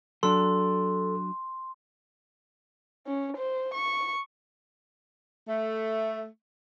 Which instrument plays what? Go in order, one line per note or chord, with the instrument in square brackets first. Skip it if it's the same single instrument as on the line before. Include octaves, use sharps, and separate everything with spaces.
[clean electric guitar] F#3 D4 [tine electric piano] A4 [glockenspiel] C6
[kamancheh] C#4
C5
C#6
[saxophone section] A3